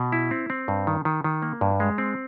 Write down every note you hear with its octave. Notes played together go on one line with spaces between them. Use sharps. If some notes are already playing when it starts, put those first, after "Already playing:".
Already playing: B2
E4
C4
C4
G2
D#3
D#3
D#3
A#3
G2
G#3
C4